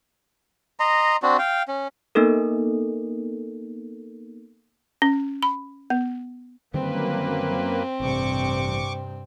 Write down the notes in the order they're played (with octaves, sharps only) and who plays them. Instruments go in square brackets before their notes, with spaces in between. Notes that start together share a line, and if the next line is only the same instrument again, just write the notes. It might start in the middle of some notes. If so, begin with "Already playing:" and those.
[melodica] D#5 A#5 C6
C4 D4 F#4
F5 G5
C#4
[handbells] A#3 B3 D#4 A4 A#4
[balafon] C#4
B5
B3
[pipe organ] F#2 A#3 B4 [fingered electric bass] D3 D#3 G3 [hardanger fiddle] C4
[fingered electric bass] A1 [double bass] G2 C3 [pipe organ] C#6 D6